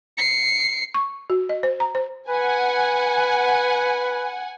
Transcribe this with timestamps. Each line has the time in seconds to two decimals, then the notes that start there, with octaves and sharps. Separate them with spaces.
0.18 C7 C#7
0.94 C#6
1.30 F#4
1.49 D#5
1.63 C5
1.80 A#5
1.95 C5
2.29 B4 F#5 G#5